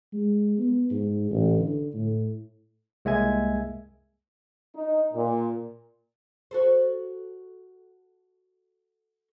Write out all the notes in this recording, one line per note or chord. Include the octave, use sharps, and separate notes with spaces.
G#3
B3
G#2
A1
D3
A2
C2 G#3 A#3 E5 G#5 G#6
D#4
A#2
F#4 A4 C5